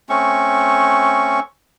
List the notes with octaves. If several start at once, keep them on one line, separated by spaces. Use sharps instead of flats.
A3 C4 C#4 C#6